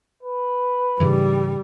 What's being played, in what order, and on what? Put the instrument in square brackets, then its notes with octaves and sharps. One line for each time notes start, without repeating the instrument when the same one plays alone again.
[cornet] B4
[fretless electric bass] G#2 C#3 E3 [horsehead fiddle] G3